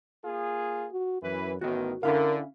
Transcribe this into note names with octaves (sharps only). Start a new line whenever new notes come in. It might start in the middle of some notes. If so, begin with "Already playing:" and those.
A#3 F4 G#4
F#4
F#2 E3 B4
A1 A2 D#3 B3 F#4
D3 C#4 E4 A#4 F5